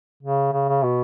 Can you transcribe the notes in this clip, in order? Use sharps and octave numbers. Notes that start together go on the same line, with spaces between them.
C#3
C#3
C#3
B2